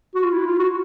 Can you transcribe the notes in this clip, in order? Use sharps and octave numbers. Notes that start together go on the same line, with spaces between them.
F#4
F4
E4
F4
F#4